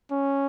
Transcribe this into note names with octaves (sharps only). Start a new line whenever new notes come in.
C#4